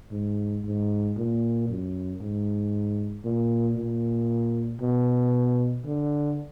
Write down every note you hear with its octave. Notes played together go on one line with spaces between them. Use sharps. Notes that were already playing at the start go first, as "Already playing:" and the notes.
G#2
G#2
A#2
F#2
G#2
A#2
A#2
B2
D3